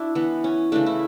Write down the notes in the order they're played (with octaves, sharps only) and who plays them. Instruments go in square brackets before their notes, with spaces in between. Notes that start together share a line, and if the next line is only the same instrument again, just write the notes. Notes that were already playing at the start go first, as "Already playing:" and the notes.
Already playing: [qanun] D4 E4 F#4
E3 B3
C#4
C#3 E3 A3 D4
E4